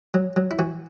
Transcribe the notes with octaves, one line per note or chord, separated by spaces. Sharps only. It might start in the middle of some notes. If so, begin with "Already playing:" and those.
F#3
F#3
E4
E3 F#4